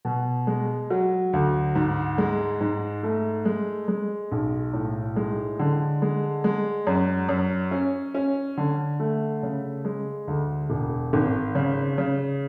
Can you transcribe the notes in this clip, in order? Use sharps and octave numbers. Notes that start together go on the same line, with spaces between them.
B2
G#3
F#3
D2
G#2
G#3
G#2
A3
G#3
G#3
B1
A2
G#3
D3
G#3
G#3
F#2
F#2
C#4
C#4
D3
A3
C#3
G#3
D2
E1
G#1
C#3
C#3